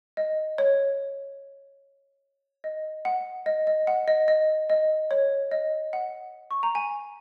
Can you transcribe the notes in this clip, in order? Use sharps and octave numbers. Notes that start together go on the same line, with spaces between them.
D#5
C#5
D#5
F#5
D#5
D#5
F#5
D#5
D#5
D#5
C#5
D#5
F#5
C#6
A#5
G#5